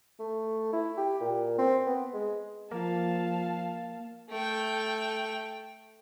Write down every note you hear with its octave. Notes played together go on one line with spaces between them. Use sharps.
A3
E4
G4
A#2
C4
B3
G#3
F3 A#3 F5 A5
A3 G5